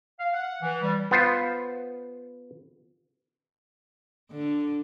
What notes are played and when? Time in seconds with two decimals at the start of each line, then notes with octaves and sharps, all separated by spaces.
0.19 F5
0.34 F#5
0.62 E3
0.82 G3
1.11 B3 F4 C5
4.31 D3